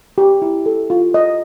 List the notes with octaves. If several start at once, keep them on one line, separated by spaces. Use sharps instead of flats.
G4
E4
A4
F4
D#5